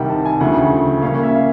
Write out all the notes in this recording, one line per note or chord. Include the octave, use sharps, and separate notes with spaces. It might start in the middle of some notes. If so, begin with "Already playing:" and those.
Already playing: C2 C3 D#3 G3 F#5 G5
A5
G#5
D2 C#3 F3 A3 F#5
A#2 G3 A#3 C#4 F5
E5
F5